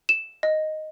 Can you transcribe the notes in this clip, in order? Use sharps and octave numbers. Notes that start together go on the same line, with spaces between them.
E7
D#5